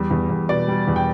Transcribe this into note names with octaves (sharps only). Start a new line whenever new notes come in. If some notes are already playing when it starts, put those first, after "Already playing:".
Already playing: E2 G3
E2
E2
B2 D5
G3
E2
G5